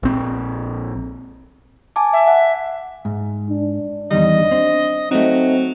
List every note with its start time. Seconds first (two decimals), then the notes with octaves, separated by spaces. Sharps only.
0.03 A#1 C4
1.96 G#5 A5 D6
2.13 E5
2.27 F#5
3.05 G#2
3.51 D4
4.11 E2 D#3 G3 D#5
4.51 C4
5.11 F#3 A3 C4 D#4